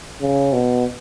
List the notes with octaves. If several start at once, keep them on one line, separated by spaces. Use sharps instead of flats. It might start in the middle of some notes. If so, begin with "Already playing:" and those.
C#3
B2